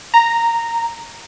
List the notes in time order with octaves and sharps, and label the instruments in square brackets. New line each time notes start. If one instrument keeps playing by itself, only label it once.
[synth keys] A#5